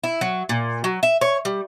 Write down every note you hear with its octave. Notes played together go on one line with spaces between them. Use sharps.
E4
F#3
A#2
F#3
E5
C#5
G3